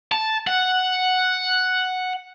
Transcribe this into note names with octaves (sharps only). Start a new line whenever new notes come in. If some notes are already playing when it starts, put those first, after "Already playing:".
A5
F#5